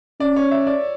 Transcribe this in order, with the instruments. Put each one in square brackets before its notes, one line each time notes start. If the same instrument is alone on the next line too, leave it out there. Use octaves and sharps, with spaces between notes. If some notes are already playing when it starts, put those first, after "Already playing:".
[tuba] C#4 [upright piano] D5
[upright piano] C#5
E5
D5